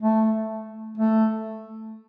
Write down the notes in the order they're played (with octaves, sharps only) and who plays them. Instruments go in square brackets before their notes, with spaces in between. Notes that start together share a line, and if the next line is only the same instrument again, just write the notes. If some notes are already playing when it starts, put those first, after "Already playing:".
[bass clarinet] A3
A3